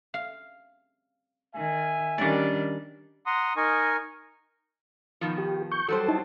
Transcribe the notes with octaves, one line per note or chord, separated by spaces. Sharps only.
F5
D#3 E5 G#5
D#3 G3 C#4 D4 D5
F#5 A#5 C6 D#6
D#4 A#4 D#5 G#5 C#6
B2 D#3 F3
G4
C#6 G6
F#3 G3 A4 C5
D#4 E4 A5